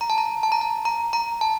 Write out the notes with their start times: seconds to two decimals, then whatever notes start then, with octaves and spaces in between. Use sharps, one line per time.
0.01 A#5
0.10 A5
0.18 A#5
0.43 A5
0.52 A#5
0.61 A5
0.85 A#5
1.13 A#5
1.41 A5